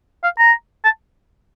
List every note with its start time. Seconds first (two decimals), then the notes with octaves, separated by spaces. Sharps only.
0.24 F5
0.39 A#5
0.84 A5